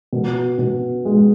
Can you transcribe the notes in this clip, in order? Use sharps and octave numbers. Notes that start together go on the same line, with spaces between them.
B2
B2
G#3